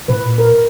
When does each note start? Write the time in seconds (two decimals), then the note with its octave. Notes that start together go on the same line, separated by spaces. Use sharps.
0.08 A2 B4
0.24 A#2
0.38 A#4